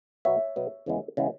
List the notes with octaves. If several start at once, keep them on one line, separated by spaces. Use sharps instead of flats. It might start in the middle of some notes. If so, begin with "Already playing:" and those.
B2 F#3 B3 C#5 E5
B2 F#3 B3
E2 C#3 E3 G#3 B3
C#3 E3 G#3 B3